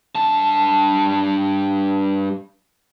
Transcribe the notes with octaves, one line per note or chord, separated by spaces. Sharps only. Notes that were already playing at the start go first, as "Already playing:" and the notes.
G2 A5